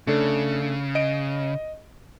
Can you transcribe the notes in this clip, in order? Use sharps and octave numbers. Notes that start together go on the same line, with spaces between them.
C#3 A3 D4 A4
D#5 D7